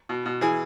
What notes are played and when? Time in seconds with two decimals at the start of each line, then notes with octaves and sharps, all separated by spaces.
0.09 B2
0.26 B2
0.41 E3 G#4